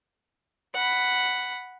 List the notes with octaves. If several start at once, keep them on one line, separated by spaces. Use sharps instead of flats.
F#5 B5